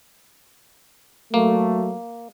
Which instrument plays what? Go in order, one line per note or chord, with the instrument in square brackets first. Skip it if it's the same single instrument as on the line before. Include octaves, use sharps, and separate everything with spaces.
[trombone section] F#3 A3 [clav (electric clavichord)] A#3